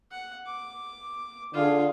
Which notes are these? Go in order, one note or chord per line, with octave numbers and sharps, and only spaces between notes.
F#5
D6
D3 F4 G#4